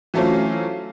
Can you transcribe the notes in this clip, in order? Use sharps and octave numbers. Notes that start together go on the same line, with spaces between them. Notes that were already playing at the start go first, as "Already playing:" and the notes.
E3 F#3 A3 C4 C#4 F4